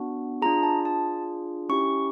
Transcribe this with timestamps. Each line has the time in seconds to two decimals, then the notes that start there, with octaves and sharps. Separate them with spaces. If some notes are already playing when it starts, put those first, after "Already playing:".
Already playing: B3 D4 F#4
0.42 D4 F4 G#4 A#5
0.63 A5
0.85 A5
1.69 C#4 E4 G4 C#6